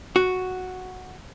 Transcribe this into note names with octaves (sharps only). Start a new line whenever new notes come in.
F#4